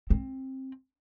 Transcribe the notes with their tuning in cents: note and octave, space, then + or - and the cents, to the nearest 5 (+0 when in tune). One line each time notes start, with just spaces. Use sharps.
C4 +20